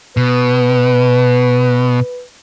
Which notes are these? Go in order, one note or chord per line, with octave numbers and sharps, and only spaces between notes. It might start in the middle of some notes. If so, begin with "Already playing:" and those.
B2 B4